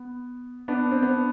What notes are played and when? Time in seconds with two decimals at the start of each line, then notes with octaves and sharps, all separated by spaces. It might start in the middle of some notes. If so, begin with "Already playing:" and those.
Already playing: B3
0.68 B3 D4
0.91 C4
1.02 B3 D4